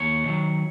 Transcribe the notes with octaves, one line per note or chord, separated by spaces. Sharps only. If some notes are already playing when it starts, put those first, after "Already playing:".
Already playing: D#2 C#5
D#3 F#3